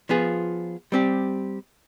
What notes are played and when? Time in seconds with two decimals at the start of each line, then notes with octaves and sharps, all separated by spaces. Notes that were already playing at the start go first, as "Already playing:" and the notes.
0.09 F3 B3 F4 G#4
0.92 G3 C4 G4